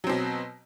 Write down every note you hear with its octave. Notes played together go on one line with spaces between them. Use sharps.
B2 F#3 C4